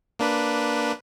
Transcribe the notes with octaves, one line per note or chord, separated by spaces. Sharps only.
A#3 D4 B4